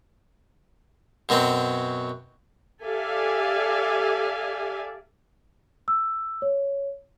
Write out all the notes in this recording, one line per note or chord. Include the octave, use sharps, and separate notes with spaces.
F#2 B2 F#3 C4
G4 A4 D5 E5 F5 G#5
E6
C#5